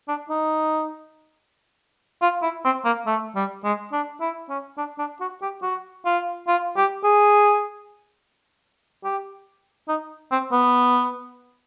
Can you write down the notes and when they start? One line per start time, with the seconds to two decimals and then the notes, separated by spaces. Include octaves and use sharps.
0.08 D4
0.29 D#4
2.22 F4
2.42 E4
2.65 C4
2.85 A#3
3.06 A3
3.35 G3
3.64 G#3
3.92 D4
4.21 E4
4.49 C#4
4.78 D4
4.98 D4
5.20 F#4
5.42 G4
5.62 F#4
6.05 F4
6.48 F4
6.77 G4
7.04 G#4
9.04 G4
9.88 D#4
10.31 C4
10.52 B3